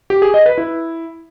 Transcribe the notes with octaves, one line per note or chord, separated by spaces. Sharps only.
G4
G#4
D#5
B4
E4